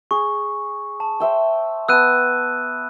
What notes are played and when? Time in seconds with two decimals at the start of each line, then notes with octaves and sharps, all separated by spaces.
0.11 G#4 C#6
1.00 A5
1.20 C5 E5 G5
1.88 B3 A5 E6 F#6 D#7